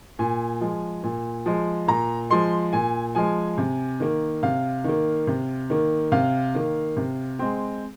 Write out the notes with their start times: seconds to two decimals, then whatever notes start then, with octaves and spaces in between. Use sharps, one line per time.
0.19 A#2 G#5
0.61 F3 G#3
1.03 A#2
1.46 F3 G#3
1.88 A#2 A#5
2.30 F3 G#3 C6
2.73 A#2 G#5
3.15 F3 G#3 G#5
3.58 C3
4.00 D#3 A#3
4.43 C3 F5
4.84 D#3 A#3
5.27 C3
5.70 D#3 A#3
6.12 C3 F5
6.55 D#3 A#3
6.97 C3
7.39 G#3 C4